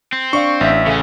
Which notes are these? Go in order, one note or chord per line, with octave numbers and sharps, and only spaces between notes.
C4
D4 D5 F5 C#6
A1 E5
C#3 C#4 A4 F5